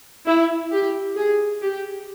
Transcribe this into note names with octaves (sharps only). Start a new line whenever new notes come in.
E4
G4
G#4
G4